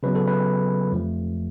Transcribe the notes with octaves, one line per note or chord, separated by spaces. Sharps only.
C#3 F#3 B3 B4
A4
B4
F2 F3 A3